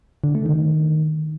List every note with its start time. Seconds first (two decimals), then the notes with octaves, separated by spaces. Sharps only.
0.24 D3
0.35 A3
0.46 D#3